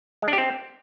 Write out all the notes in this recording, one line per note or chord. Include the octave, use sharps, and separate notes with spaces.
G#3
D4
G4
C4